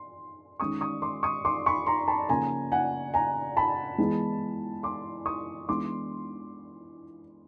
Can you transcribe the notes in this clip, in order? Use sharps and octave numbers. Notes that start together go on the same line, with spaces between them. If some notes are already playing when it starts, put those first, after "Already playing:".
Already playing: C6
D#3 G#3 C#4 C#6 D#6
C#6 D#6
C6 D6
C#6 D#6
C6 D6
B5 C#6
A#5 C6
A5 B5
C#3 F3 A#3 G#5 A#5
F#5 G#5
G#5 A#5
A5 B5
E3 G#3 B3
C6 D6
C#6 D#6
E3 G#3 B3 D4 C6 D6